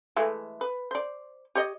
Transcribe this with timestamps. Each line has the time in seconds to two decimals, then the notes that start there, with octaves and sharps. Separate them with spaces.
0.16 E3 G#3 A3
0.61 B4
0.91 C5 D5
1.55 G4 C#5 D#5